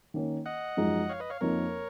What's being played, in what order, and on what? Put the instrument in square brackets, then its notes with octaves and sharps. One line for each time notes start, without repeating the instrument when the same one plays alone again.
[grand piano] D#3 A#3 C#4
[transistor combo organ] D#5 F#5
[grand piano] F#2 F3 G#3 D#4
[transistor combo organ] C#5 F5
B4 D#5
C#5 F5
[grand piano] F2 F3 A#3 D#4 [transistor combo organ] A#4 C#5